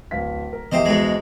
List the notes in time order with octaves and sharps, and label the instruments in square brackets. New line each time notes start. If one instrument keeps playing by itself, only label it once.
[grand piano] D1 F5 B6
A#4
[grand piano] E2 E5 [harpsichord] G4 C5 D#5
[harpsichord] G#2 B2 G#3